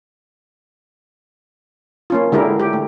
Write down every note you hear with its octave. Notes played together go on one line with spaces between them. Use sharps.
A#3 C#4 F4
D3 G#3 E4 G4 A#4
G4
A3